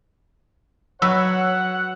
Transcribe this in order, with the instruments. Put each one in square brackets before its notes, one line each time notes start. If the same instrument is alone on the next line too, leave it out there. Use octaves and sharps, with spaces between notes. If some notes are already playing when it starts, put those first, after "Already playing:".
[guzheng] F#3 B4 [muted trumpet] C#5 [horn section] F#5 [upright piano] E6